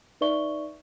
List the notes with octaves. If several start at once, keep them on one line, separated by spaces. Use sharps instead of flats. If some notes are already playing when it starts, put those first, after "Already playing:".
D#4 B4 D5 E5 C#6 G7